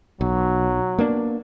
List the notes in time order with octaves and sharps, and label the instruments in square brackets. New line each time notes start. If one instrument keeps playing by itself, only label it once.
[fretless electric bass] B1 [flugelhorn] F#3
[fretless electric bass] A#3 B3 D4